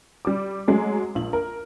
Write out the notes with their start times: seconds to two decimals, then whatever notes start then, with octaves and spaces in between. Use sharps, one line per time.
0.25 G3 D6
0.68 F#3 G#3 A3
1.15 A#1 F#7
1.33 A#4